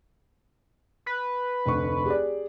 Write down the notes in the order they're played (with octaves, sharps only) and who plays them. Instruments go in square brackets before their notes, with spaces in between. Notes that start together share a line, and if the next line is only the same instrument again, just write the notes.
[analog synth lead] B4
[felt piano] F1 D2 C#6
G4 G#4 D5